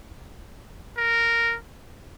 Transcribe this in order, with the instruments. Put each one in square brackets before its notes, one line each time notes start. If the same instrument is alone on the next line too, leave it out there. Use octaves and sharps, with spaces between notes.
[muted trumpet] A#4